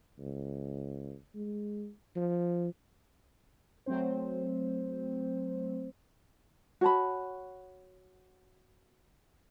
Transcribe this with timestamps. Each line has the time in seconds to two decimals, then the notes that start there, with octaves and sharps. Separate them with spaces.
0.19 C#2
1.35 G#3
2.16 F3
3.86 F#3 A3 C4 C5
6.81 F#4 C#5 A5 B5